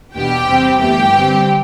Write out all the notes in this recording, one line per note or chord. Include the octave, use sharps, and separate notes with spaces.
E2 B2 B3 D4 G4 G5
E2 C3 G3 C4
G1 G2 E3 A3 G4 G5
G2 D3 G3 C4